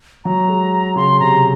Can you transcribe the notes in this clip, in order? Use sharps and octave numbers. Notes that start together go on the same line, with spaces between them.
F#3 A#5
G#3
C#3 C6
C3 A#5